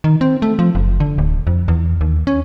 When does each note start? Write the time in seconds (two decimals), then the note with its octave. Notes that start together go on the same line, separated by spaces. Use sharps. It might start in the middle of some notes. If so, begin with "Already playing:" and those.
0.04 D#3
0.21 C4
0.42 A3
0.59 F3
0.75 F#1
1.00 D3
1.18 D1
1.47 F2
1.68 E2
2.01 D#2
2.27 C#4